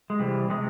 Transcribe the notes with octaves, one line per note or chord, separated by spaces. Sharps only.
G#3
C3 E3 G3
C3 G#3